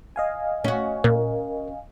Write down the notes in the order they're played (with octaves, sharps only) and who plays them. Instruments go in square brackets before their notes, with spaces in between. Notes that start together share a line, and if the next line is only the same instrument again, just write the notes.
[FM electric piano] D#5 F5 G#5
[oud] C#4 F#4
[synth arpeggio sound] A#2 [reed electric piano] A#4